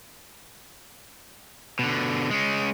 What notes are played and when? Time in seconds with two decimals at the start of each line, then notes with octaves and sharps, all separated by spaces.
1.79 B2 D3
2.30 G#3 C#4